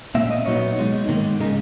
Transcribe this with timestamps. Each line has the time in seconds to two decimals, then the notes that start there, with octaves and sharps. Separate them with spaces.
0.15 A#2 A#3 C#4 E5
0.31 D#5
0.46 A#2 F#3 B3 D#4 C#5
0.78 B2 G#3 D#4
1.08 G#2 D#3 A#3
1.41 C#3 G#3 D#4